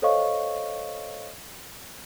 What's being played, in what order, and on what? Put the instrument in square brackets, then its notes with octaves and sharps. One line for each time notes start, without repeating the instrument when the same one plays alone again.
[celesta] A4 C5 C#5 D#5 F5 C#6